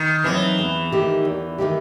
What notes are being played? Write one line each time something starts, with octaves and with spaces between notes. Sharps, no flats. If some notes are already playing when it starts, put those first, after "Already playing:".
Already playing: D#3
E3 F#3 C4 D#4
E2
D#3 A3 D#4 G4
E2
D#3 A3 D#4 G4